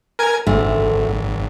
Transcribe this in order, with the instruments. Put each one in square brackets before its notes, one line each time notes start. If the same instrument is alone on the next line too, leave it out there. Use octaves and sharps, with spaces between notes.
[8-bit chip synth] A#4 G#5 G#6
[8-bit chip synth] G#1 [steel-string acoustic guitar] D2 A3